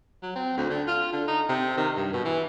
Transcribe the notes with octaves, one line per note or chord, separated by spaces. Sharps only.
F#3
C4
D2
D3
F4
D3
D#4
C3
D#3
G2
B2
E3